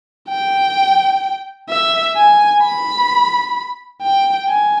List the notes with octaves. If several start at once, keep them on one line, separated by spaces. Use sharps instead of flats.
G5
E5
G#5
B5
G5
G#5